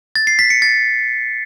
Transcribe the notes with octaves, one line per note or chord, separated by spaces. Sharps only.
A6
C7
B6
C#7
A6